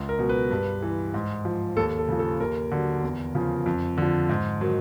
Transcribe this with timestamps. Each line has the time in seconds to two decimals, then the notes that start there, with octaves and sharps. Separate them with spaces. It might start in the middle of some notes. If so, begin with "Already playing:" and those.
Already playing: C#2
0.09 A#4
0.19 B2 F#3
0.29 B4
0.51 G2
0.82 E3
1.14 G#2
1.45 F3
1.77 D#2 A4
1.98 A4
2.08 C#3 F3
2.19 A4
2.40 D#2 A#4
2.72 D3 F#3
3.03 E2
3.35 C#3 F3
3.66 F2
3.98 D3 F3
4.29 G#2
4.61 D#3 F#3